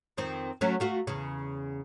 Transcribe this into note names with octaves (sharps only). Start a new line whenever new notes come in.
F2 D#3 C4
F#3 A3 C#4
A3 F4 F#4
E2 C#3